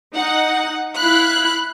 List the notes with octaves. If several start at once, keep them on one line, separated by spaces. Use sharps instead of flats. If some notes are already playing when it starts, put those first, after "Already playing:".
D#4 F#5
E4 F5 B5 F#6